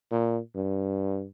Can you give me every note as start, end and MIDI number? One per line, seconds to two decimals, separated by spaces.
0.11 0.39 46
0.56 1.26 43